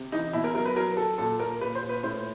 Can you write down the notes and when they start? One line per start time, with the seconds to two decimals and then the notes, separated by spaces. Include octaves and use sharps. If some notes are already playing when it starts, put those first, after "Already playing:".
Already playing: C3
0.12 E3 D#4
0.33 B2 E4
0.44 A#4
0.55 F#3 A#4
0.65 B4
0.76 F#3 A#4
0.97 F#3 A4
1.18 A#2 A4
1.39 A#2 A#4
1.61 A#2 B4
1.75 C5
1.82 A#2
1.89 B4
2.03 A2 C5